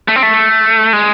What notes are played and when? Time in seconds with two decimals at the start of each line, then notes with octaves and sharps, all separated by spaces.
0.08 A3
0.16 C4
0.23 A3
0.93 G#3